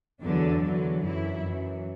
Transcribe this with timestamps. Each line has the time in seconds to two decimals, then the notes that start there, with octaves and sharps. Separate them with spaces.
0.22 E2 D3 F#3 D4
0.62 E2 D3 F#3
1.03 F#2 E3 E4
1.44 F#2 E3